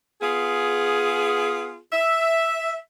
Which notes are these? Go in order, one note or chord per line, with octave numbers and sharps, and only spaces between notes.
B3 F4 G#4
E5